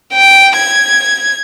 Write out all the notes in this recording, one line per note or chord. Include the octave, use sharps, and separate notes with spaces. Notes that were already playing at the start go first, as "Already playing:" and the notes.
G5
G#6